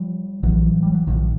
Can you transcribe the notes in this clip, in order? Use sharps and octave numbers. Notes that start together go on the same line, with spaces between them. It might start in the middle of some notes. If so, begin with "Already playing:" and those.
Already playing: F3 G3
A#1 A2 E3 F#3
G3
F#3
A#1 A2 D#3 F3